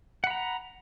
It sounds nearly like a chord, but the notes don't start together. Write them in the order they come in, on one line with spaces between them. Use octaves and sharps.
F#5 B5 A#5